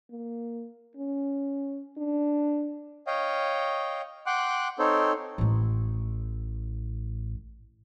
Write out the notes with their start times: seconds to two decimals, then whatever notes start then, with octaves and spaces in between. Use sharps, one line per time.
0.11 A#3
0.96 C#4
1.98 D4
3.07 C#5 D#5 F5 G5
4.26 F#5 G5 C6 D6 F#6
4.79 C4 D#4 A4 C5 C#5
5.38 A1 A2